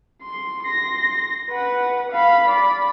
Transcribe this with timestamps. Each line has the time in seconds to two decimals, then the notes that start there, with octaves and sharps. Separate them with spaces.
0.23 C6
0.63 C6 A#6
1.51 B4 F#5
2.12 F5 B5
2.48 D5 B5